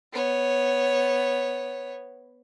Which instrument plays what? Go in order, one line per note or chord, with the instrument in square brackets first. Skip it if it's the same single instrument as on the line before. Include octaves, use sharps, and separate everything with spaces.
[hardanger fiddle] B3 C#5